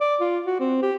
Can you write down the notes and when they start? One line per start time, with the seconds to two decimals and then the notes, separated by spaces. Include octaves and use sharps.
0.01 D5
0.20 F4
0.46 F#4
0.60 C4
0.82 G4